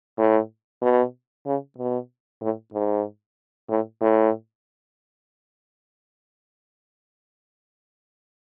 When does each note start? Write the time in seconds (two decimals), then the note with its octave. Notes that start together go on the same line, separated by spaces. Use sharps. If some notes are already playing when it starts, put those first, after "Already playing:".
0.19 A2
0.82 B2
1.46 C#3
1.78 B2
2.41 A2
2.73 G#2
3.69 A2
4.01 A2